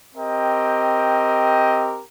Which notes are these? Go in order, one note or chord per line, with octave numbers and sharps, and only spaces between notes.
C4 G4 A#4 D#5 G5